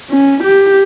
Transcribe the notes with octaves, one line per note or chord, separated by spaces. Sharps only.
C#4
G4